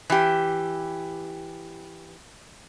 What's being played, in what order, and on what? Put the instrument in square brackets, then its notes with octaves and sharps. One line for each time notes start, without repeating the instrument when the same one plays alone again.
[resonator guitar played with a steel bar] E3 G4